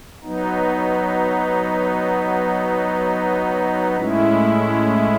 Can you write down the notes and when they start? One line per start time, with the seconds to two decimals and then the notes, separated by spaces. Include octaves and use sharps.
0.23 F#3 B3 D#4
3.97 A2 G#3 C#4 E4